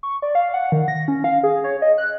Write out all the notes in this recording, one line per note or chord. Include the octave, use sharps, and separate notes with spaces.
C#6
D5
F5
F#5
D#3
A#6
C#4
F5
G#4
C#5
D#5
F#6